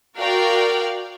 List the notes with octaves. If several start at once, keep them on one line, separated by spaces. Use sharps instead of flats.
F#4 A#4 D5 F5 G5